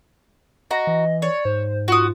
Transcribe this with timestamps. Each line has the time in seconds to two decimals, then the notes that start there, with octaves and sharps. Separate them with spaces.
0.71 F#4 D#5 A#5
0.87 E3
1.22 C#5 D5
1.45 G#2 C5
1.88 F4 F#4 D#6